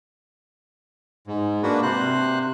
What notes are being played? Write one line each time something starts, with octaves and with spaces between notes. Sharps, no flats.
G#2
A#3 D4 F#4 B4 F#5
C3 C5 F#6